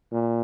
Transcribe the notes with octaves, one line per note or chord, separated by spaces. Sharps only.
A#2